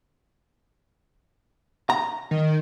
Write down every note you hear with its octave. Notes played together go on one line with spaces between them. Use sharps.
A#5
D#3